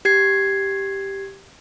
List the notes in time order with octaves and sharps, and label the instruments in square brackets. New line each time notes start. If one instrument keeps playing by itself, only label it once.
[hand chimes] G4 G#6 C7